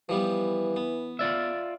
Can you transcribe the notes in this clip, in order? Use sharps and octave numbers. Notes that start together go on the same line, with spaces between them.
E3 F3 G3 B3
B3
F4 D5 E5